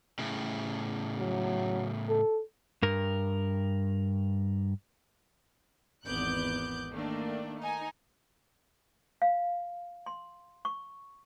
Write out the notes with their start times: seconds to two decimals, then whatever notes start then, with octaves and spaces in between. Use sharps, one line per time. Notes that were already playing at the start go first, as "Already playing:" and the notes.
0.19 A2 C#3
1.18 F#3
2.09 A4
2.82 G2 A#4
6.05 G#1 E2 B3 D6 F#6 G6
6.90 D#3 A3 A#3 D4
7.61 D#4 G#5
9.22 F5
10.06 C6
10.65 C#6